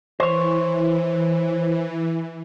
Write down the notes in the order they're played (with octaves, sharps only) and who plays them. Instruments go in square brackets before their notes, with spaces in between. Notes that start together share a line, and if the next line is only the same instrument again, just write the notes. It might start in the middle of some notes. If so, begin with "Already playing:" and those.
[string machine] E3 [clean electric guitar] C5 C#5